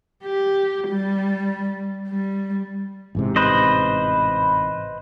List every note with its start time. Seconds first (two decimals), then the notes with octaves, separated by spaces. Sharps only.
0.25 G4
0.89 G3
2.08 G3
3.15 A1 G#2 C3
3.36 B4 C5 D#5